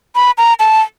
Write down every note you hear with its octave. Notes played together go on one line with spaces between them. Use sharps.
B5
A#5
A5